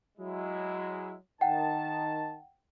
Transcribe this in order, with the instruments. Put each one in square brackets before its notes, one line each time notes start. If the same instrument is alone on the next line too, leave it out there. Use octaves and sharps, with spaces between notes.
[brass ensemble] F#3 G#3 E4
[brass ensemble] D#3 A5 [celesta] F#5 G5